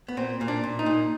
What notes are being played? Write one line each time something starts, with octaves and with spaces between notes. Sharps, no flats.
B3
A#2 C4
A#2
D4
A#2
D#4
A#2